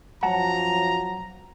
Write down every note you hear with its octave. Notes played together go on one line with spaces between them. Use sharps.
F#2 F3 F#3 F#5 A5 A#5